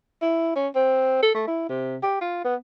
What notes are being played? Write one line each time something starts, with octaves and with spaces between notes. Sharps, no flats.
E4
C#4
C4
A4
A3
E4
C3
G4
F4
B3